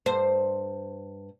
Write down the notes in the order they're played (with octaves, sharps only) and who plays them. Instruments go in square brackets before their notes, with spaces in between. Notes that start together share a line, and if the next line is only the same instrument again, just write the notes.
[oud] G2 C5